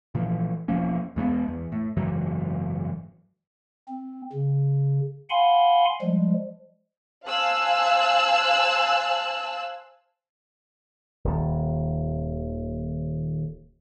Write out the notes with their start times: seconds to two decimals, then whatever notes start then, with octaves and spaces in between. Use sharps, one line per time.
0.15 A#2 E3 F3
0.68 E1 F3 A#3 C#4
1.16 E2 G#3 A#3 B3
1.48 E2
1.72 A2
1.97 F#1 G#2 E3 F#3
3.88 C4
4.33 C#3
5.30 F5 F#5 G#5 B5 C6
6.02 F3 G3 G#3
7.26 C5 F5 G#5 A5 E6 F#6
11.24 D#1 D#2